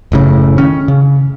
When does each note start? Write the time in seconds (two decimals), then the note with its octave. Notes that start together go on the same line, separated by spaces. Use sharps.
0.12 F#1 A2 C#3
0.58 D#3 C#4
0.88 C#3